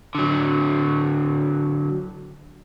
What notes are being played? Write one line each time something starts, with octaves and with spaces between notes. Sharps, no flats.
D3 F#3